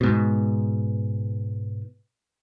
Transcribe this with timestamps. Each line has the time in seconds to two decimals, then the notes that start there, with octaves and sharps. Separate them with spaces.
0.01 G#2 B2